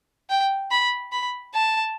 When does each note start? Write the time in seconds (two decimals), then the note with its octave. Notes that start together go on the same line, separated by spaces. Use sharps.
0.30 G5
0.71 B5
1.12 B5
1.54 A5